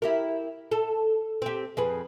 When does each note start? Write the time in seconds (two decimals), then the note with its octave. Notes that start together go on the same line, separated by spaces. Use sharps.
0.02 E4 G4 A#4
0.71 A4
1.42 C4 G4
1.77 F2 G#4 B4